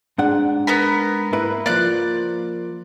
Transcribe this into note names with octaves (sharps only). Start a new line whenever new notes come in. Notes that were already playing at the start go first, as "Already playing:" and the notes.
G#2 D4 F#5
B3 A#4 B5
A#3 E4 B4
F3 A#3 D5 F#6